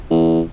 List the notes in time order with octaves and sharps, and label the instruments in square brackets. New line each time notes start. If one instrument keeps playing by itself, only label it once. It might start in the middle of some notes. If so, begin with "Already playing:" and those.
[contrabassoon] E2